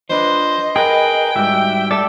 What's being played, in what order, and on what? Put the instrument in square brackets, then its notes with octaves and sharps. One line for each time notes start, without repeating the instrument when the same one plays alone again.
[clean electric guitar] F3 D4 B4 [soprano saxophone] C5 [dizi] D#5
[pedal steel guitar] G#4 B4 [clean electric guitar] A#4 [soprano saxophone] G5
[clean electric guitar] G#2 G3 F#4 [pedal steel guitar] E5
[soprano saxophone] A4 [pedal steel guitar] D5 E5 A5